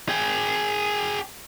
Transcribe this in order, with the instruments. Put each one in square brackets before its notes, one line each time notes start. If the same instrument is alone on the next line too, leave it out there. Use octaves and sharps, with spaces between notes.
[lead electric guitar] G#4 G5